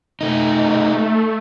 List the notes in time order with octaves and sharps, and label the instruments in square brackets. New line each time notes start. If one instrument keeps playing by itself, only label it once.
[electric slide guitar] A3 D#4
[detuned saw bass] A3